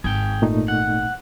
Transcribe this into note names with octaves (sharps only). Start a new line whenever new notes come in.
G#1 G#4 G5
A#2 A3 D#4
F#5